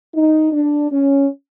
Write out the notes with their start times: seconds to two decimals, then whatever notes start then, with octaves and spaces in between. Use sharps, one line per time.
0.14 D#4
0.53 D4
0.92 C#4